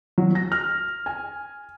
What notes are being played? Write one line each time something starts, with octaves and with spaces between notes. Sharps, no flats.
F#3
A#6
F6
G#5